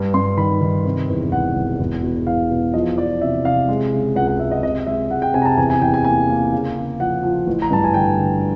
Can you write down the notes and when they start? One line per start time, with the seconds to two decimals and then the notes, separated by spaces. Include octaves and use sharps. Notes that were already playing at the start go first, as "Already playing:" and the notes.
Already playing: G2
0.14 G2 C6
0.37 D#3 B5
0.61 D#3
0.85 C3
1.09 E2
1.32 E1 F#5
1.56 E1
1.80 E2
2.03 B2
2.27 E2 F5
2.51 B2
2.74 F3 D#5
2.98 F3 D5
3.21 C3 E5
3.45 C3 F5
3.69 G#3
3.93 C#3
4.16 C#2 F#5
4.28 F#5
4.39 G#3 E5
4.51 D#5
4.63 C3 D#5
4.87 G#3 E5
5.11 G#3 F#5
5.22 G5
5.34 C3 G#5
5.42 A#5
5.45 A5
5.57 E2 G#5
5.70 G#5
5.82 E2 G5
5.94 G#5
6.04 A#3 G#5
6.29 A#3
6.52 C#3
6.76 C#3
7.00 F3 F#5
7.23 F3
7.47 A1
7.62 A#5
7.71 G2 A5
7.84 G#5
7.94 D3 G5
8.18 D3